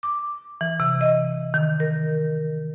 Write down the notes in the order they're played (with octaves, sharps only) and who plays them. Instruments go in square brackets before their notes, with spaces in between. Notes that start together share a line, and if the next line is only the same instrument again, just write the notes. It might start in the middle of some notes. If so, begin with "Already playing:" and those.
[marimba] D6
E3
C3
D#5
D#3
A#4